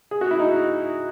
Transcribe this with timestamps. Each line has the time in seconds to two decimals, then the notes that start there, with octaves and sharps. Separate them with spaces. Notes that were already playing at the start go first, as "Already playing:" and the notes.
0.11 G#4
0.21 F#4
0.31 E4
0.39 D#4